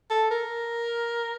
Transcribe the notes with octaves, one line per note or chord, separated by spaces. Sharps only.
A4
A#4